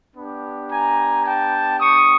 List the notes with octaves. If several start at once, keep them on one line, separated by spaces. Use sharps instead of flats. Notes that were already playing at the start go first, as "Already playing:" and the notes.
B3 D4 G4
G#5 A#5
G5 A5
C#6 D#6